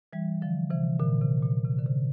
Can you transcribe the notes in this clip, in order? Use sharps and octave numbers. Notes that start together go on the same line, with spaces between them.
E3 G3
D3 F3
C3 E3
A#2 D3
C3
A#2
C3
D3
C3